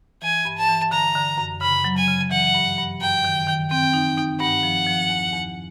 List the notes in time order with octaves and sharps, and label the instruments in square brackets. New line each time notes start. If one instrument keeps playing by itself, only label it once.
[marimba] E3 [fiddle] G#5
[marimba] G2
[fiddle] A5
[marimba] E3
[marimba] D3 [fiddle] A#5
[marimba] D3
F#2
[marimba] C#3 [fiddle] B5
[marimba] F#3
[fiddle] G#5
[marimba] C#3
[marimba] E3 [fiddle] F#5
[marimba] G2
G2
[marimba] F#2 [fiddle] G5
[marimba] D#3
D#3
[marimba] C4 [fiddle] G5
[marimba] D#4
D#4
[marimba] G2 [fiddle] F#5
[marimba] F3
F3
E2
E2